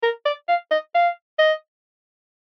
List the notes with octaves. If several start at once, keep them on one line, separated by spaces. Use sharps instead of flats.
A#4
D5
F5
D#5
F5
D#5